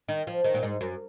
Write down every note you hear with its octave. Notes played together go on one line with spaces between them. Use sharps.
D#3
F3
D#3
A#2
G#2
F#2